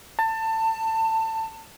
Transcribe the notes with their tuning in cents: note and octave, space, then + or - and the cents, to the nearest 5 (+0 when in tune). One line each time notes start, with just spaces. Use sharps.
A5 +25